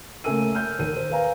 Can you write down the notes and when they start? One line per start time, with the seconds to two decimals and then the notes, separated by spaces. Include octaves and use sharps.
0.24 C#3 A3 A#3 G#5 E6 D#7
0.55 F6 G6
0.79 D#2 A#4 D#7
0.96 C5
1.11 B4 F5 G#5 A#5